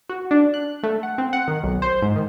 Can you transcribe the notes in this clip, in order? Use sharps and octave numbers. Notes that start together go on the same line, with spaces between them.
F#4
D4
F#6
A3
F#5
C4
F#5
D#3
B1
C5
G#2
D#3